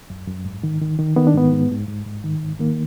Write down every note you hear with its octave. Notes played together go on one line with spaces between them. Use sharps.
F#2
F#2
G#2
D#3
D#3
D#3
D#3 B3
D4
G#2 B3
G#2
G#2
G#2
G#2
D#3
G#2
D#3 A#3